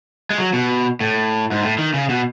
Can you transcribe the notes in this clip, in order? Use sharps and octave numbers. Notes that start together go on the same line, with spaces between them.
G#3
F#3
B2
A2
G#2
A2
D#3
C#3
B2